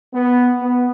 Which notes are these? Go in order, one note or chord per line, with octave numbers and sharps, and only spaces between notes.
B3
B3